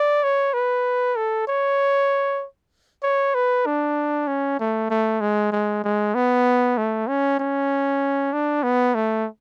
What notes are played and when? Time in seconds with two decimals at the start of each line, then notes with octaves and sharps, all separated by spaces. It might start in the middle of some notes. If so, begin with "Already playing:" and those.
Already playing: D5
0.24 C#5
0.54 B4
1.17 A4
1.48 C#5
3.03 C#5
3.35 B4
3.66 D4
4.28 C#4
4.60 A3
4.90 A3
5.21 G#3
5.52 G#3
5.84 G#3
6.15 B3
6.78 A3
7.08 C#4
7.40 C#4
8.33 D4
8.64 B3
8.95 A3